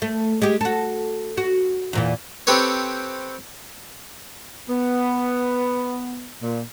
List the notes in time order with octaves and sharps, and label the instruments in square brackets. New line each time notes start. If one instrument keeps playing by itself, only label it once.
[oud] A3
G#3 G4
F#4 A4
F#4
E2 A#2 E3
[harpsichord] C4 G4 A4 B4 C#5
[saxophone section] B3
A#2